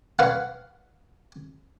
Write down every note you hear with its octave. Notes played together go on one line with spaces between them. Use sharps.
B4 F5 F#5